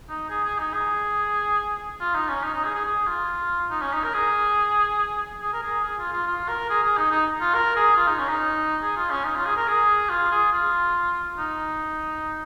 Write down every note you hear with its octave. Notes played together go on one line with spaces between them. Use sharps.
D#4
G#4
G#4
D#4
G#4
F4
D#4
C#4
D#4
D#4
G#4
G#4
G#4
F4
D#4
C#4
D#4
A#4
G#4
G#4
A#4
G#4
G#4
F4
F4
F4
A#4
G#4
G#4
D#4
D#4
F4
A#4
G#4
F4
D#4
C#4
D#4
G#4
F4
C#4
D#4
F4
G#4
A#4
G#4
F4
G#4
F4
D#4